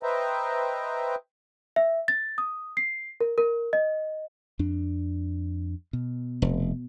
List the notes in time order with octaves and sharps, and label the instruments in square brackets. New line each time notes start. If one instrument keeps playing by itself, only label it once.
[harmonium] B4 C5 D#5 E5 G5 A#5
[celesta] E5
A6
D#6
C7
A#4
A#4
D#5
[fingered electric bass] F2 D4
B2
[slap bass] F1